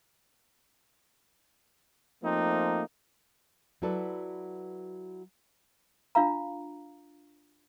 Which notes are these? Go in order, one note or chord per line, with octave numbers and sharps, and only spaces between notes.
F3 A3 A#3 C4 D#4
F#3 E4 F#4 A4 B4 D5
D4 F4 F5 A#5